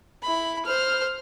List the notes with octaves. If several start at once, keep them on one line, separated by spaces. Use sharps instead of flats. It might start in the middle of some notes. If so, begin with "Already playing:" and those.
E4 B5
C5 F6